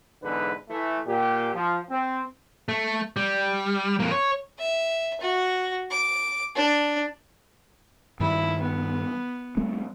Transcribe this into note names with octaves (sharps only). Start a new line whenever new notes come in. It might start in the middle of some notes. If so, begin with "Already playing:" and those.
E2 G#2 D3 B4
E3 A3
A#2 G4
F3
C4
A3
G3
F2 A#3
C#5
E5
F#4
D6
D4
G2 D#3 G3 E4
B3
G3 A3 C4